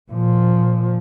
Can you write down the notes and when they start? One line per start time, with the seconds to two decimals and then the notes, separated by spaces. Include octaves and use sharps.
0.11 A#2 F3